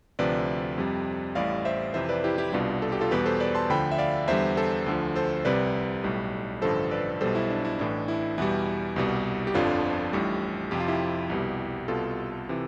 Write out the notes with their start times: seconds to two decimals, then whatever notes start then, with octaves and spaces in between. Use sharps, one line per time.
0.19 D2 C3 F3 B4 D5
0.78 F2 C3 G3
1.35 A1 A2 G3 D5 F5
1.65 C5 E5
1.94 F2 C3 E3 C5 E5
2.09 B4 D5
2.24 E4 G4
2.38 E4 G4
2.52 C2 B2 G3 D4 F4
2.82 A4
2.92 G4
3.01 F4 A4
3.11 E2 B2 G3 G4 B4
3.26 A4 C5
3.40 B4 D5
3.55 A5 C6
3.70 D2 D3 F3 G5 B5
3.92 E5
3.98 D5 F5
4.28 E2 D3 G3 C5 E5
4.57 A4 C5
4.86 D2 D3 F3
5.16 A4 C5
5.45 C2 C3 G3 B4 D5
6.04 B1 A2 G3
6.62 A1 G2 D3 F3 A4 C5
6.91 B4 D5
7.21 B1 B2 G3 A4 C5
7.35 E4
7.50 D4
7.65 E4
7.79 A1 A2 E3 D4
8.08 E4
8.38 E2 B2 G3 E4
8.96 C2 B2 G3
9.47 G4
9.54 G1 F2 D3 F3 D4 F4
10.13 A1 A2 G3
10.71 F2 C3 F3 G4
10.80 F4
10.88 E4 G4
11.30 C2 B2 G3
11.88 C2 B2 G3 F4 A4
12.49 C3 E3